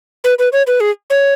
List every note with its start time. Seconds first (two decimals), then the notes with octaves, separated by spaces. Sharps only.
0.24 B4
0.39 B4
0.53 C#5
0.67 B4
0.80 G#4
1.10 C#5